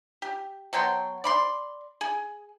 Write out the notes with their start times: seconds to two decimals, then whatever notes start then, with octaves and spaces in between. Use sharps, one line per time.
0.22 G4
0.73 B2 F#3 G5 C6
1.24 D5 B5 C6
2.01 G#4